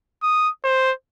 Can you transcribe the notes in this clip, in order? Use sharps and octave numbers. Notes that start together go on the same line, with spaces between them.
D#6
C5